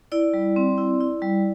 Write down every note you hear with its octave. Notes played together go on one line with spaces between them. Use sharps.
E4 D5
G3
C4
E4
E4
G3